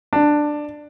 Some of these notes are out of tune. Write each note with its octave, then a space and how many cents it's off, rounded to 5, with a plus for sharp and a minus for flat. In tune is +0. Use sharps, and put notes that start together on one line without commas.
D4 +10